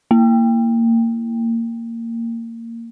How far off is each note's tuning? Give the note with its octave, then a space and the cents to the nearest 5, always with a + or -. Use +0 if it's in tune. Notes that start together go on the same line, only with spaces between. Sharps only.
A#3 -20